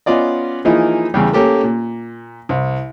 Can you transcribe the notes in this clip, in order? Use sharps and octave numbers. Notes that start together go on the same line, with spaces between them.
B3 C#4 F4 D5 D#5
E3 F3 A#3 D#4 E4 G#4
E2 C#3 G3
A3 A#3 C#4 G4 A4
A#2
C2